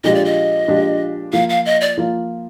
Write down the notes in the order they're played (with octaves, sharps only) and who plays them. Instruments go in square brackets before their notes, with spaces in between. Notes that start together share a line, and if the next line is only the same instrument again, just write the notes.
[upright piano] A#2 F3 G#3 D4 G4 [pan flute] D#5
[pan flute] D5
D#5
[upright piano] A#2 F3 G#3 D4 G4
[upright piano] F3 A#3 F4 [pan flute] F5
[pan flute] F5
D#5
D5
[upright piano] F3 A#3 F4